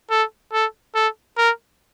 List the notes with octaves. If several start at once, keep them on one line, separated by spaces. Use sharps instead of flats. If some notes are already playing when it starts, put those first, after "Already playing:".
A4
A4
A4
A#4